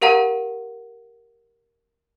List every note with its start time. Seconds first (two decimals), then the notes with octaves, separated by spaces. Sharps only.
0.02 G4 A#4 F5 F#5 A#5